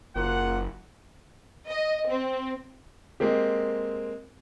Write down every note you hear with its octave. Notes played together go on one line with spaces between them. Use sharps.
F#1 A#3 F4 F#5
D#5
C4
G#3 A#3 C4 G4